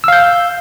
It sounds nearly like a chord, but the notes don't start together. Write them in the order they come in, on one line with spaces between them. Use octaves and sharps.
E6 F5 G6